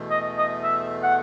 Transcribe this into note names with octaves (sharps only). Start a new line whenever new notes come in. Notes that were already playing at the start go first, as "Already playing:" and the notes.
Already playing: E2 B2 A3
D#5
D#5
E5
F#5